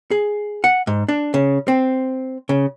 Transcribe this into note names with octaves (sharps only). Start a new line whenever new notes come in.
G#4
F#5
G#2
D4
C#3
C4
C#3